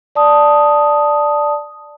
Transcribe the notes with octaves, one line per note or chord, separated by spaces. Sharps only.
D5 A5 D#6